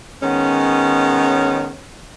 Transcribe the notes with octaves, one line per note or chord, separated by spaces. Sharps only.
D#3 G#3 B3 C#4